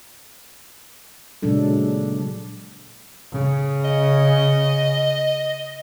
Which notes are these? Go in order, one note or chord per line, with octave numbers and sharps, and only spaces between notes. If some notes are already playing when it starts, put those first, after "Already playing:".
A#2 C#3 F#3 G#3 D4 A4
C#3
D#5